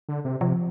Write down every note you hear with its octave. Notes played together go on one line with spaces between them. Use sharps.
D3
C3
C3 F3